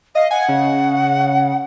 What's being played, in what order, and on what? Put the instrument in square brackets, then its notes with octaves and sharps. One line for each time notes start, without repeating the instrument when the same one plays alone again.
[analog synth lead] D#5 [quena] F5
[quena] F#5 [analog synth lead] G#5
[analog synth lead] C#3